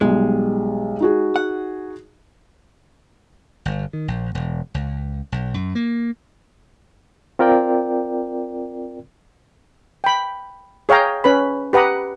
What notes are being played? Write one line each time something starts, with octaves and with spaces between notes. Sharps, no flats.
B1 G3 G#3
D#4 F#4 G#4
F#5
G1
D#3
A#1
E1
C#2
B1
F#2
A#3
C4 F4 A#4 D5 G5
G5 B5
G#4 C#5 F5 G5 A#5
C#4 B4 B5
G4 B4 F#5 A#5 D#6